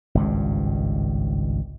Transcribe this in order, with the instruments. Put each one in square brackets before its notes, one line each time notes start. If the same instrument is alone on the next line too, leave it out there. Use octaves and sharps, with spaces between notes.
[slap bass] G#1 C#2 G2